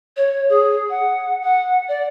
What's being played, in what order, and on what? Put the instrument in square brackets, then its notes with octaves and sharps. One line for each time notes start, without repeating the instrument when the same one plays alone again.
[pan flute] C#5
G#4
F#5
F#5
D5